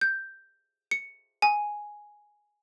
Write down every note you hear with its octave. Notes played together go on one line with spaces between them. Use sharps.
G6
C#7
G#5